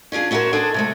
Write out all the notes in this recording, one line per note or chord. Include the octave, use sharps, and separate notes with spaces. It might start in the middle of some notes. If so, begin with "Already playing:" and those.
C#4 D4 F4 G#4
C#4 E4 F#4 A4 A#4 C5
D4 G#4 A4 C5
C3 G#3 A3